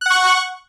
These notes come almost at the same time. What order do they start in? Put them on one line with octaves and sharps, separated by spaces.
F#6 F#5 C#6